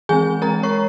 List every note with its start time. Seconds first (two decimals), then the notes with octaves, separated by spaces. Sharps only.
0.09 E3 G#3 C4 G#4 G#5
0.42 E3 G#3 C4 A#4 A#5
0.63 C#5 C#6